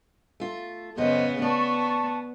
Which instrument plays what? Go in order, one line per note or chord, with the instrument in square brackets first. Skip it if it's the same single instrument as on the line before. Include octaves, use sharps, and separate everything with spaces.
[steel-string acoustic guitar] A3 F4
[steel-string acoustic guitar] F#2 C5 D#5 [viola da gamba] C#3 B3
[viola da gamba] B3 [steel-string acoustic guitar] D5 [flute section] A5 C#6